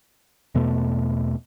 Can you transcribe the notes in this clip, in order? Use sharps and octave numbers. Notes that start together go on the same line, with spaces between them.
E2 B2 A3